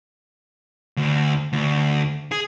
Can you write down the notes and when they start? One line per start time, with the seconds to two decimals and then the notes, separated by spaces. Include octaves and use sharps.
0.97 D2
1.53 D2
2.32 G#4